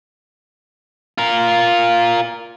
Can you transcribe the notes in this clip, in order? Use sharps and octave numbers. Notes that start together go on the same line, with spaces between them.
F4 A#4